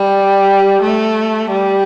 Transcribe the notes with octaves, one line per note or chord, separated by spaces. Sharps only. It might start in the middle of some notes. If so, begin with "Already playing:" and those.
Already playing: G3
A3
G3